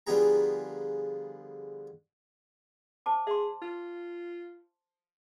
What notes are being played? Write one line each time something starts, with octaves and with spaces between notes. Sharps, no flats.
D3 F3 G3 B3 G#4 A#5
C5 A5 D6
G#4 E5 C6
F4